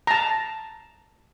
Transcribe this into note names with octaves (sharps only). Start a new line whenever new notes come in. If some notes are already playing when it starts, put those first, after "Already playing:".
A5 A#5